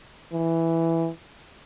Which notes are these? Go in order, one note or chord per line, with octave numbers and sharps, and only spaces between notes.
E3